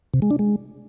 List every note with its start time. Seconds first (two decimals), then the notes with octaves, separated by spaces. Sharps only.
0.14 C3
0.22 G#3
0.31 D4
0.39 G#3